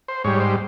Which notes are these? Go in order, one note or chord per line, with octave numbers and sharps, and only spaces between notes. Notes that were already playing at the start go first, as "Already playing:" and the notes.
C5
G#2 G3 C#5
C5